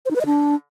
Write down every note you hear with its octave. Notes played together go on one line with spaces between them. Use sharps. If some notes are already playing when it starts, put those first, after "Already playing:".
C5
D#4
B4
D#5
D4